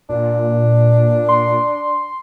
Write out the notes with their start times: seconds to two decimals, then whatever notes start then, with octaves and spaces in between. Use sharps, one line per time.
0.10 A#2 D4
1.29 C6